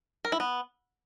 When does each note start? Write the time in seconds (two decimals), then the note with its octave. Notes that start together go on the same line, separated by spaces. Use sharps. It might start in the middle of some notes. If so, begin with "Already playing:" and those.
0.25 A#4
0.32 E4
0.40 B3